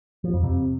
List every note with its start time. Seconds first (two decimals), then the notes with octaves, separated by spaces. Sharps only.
0.24 F3
0.33 F2
0.43 C3